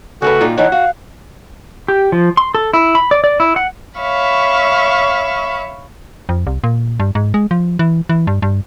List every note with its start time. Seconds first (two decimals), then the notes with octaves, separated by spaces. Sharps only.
0.22 C#3 A3 F#4 A4 B4
0.41 A#2 D#4 F4
0.58 E3 D#4 C#5 D#5 F#5
0.72 F#4 F5
1.88 G4
2.12 F3
2.37 C6
2.55 A4
2.73 E4
2.95 B5
3.11 D5
3.24 D5
3.40 E4
3.56 F#5
3.99 C#5 E5 F5 B5 C#6
6.29 F2
6.47 C2
6.64 A#2
7.00 G2
7.15 G#2
7.34 G#3
7.51 F3
7.79 E3
8.09 E3
8.27 G2
8.42 G2